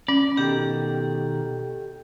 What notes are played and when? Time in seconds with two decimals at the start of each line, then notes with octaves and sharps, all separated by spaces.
0.08 C#4 D5
0.37 B2 D#3 G4 A4 G5